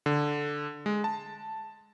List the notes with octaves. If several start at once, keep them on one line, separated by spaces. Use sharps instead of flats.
D3
G#3
A5